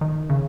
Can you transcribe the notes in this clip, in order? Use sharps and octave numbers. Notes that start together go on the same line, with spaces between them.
D#3
C#3